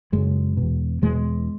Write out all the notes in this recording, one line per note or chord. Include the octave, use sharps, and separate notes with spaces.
F#2 C#3 G#3
B2
E2
E2 B2 G#3